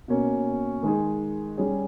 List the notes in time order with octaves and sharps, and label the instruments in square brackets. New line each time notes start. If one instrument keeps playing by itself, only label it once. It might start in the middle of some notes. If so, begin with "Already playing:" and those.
[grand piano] B2 A#3 C#4
D#3 G#3 D#4 G#4
G3 C#4 G#4